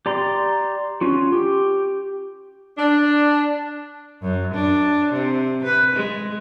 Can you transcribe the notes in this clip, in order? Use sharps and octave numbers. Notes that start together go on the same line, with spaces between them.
G4 D5 A#5 C6
C#4 F4 F#4
G4
D4
F#2
D4
C3
B4
G#3